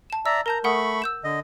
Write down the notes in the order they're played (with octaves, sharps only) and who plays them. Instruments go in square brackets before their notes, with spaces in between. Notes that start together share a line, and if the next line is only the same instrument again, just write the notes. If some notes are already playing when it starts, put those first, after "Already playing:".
[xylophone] A5 E7
[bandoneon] D5 E5 A#5 [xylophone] E6
[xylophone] A#4 A5 G6 [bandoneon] A#5
[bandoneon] A3 B5 C#6 [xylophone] A#4 F#5 D#6
[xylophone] E6 G6 E7
[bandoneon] D3 D#5